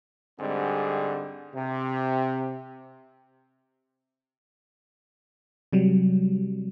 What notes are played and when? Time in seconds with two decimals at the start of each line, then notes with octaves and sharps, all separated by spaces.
0.40 G#2 D3 G3 G#3 C4
1.55 C3
5.73 C3 F#3 G3